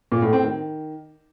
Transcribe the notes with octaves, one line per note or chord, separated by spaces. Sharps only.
A#2
A2
C4
D#3